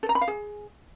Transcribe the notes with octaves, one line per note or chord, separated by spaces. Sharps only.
A4
A#5
B5
F5
G#4